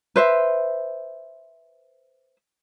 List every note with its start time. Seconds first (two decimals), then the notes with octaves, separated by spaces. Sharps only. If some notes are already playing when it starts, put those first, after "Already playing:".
0.16 B4 C5 E5